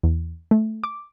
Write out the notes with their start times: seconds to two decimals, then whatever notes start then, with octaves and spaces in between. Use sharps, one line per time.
0.03 E2
0.51 A3
0.84 D6